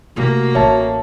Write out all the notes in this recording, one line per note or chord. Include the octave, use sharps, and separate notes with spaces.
C3 A3 A#3 F#4
A1 C#5 E5 A5